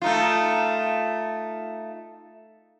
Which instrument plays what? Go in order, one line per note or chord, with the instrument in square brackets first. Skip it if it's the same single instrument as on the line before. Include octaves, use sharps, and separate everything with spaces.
[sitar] A3 D#4 F4